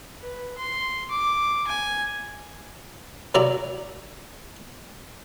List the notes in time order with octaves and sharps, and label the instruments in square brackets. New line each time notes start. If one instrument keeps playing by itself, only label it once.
[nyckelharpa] B4
C6
D6
G#5
[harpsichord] C2 F#3 E4 D5 A#5